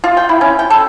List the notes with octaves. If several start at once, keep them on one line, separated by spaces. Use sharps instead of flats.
F4
G5
E4
C#4
G5
A4